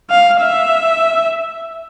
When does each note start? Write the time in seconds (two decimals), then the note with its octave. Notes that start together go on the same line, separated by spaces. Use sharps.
0.10 F5
0.40 E5